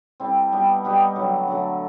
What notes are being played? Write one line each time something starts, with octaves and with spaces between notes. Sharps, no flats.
G3 C4 E4 A4
G3 B3 D#4 G4
G3 B3 D#4 G4
D3 F#3 A3
D3 F#3 A3